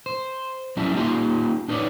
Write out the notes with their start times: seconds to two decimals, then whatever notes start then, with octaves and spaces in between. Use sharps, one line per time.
0.06 C5
0.77 F#3 G3 C#4 E4 E5 A5
0.95 A#3 D#4 F4 G4 F#5 C6
1.68 D4 D#4 B4 C#5 D5